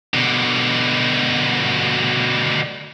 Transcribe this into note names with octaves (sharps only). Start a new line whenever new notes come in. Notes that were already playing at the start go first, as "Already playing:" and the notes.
B2 D3